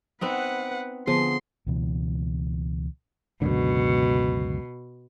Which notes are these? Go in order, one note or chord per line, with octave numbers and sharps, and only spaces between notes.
B3 C4 D#4 B4 F#5
D3 F3 B3 G#4 C6
C#2 B2 E3
C#2 F#2 B2 D3